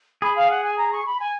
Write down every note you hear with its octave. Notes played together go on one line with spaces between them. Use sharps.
G#4 B5
F5
F#5
G#5
A#5
C#6
B5
G#5